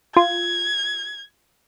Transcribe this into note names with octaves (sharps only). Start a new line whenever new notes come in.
F4 G#6